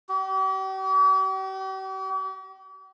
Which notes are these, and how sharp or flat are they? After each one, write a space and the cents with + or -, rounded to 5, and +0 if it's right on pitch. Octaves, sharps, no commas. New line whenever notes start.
G4 -45